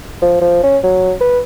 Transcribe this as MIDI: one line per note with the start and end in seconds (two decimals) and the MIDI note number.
0.22 0.38 53
0.42 0.63 53
0.63 0.78 61
0.83 1.14 54
1.20 1.40 71